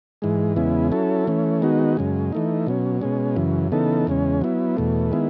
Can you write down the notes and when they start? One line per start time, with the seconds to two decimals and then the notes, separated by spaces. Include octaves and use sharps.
0.22 G#2 E3 G#3
0.56 E2 C#3 G#3 B3 E4
0.92 F#3 C#4 E4 A4
1.27 E3 A3 C#4
1.62 D#3 G#3 B3 D#4 F#4
1.97 F#2 C#3 G#3
2.32 E3 A3 D#4
2.67 B2 F#3 C#4
3.01 B2 G#3 C#4
3.36 F#2 C#3 E3
3.72 C#3 E3 B3 D#4 A4
4.07 E2 C#3 G#3 C#4
4.41 F#3 B3 E4
4.77 E2 B2 A3
5.12 D#3 G#3 B3 E4